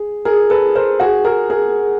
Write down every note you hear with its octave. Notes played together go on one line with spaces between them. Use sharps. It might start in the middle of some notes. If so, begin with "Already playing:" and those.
Already playing: G#4
G#4 A#4
A4 B4
A#4 C5
F#4 G#4
G#4 A#4
G#4 A#4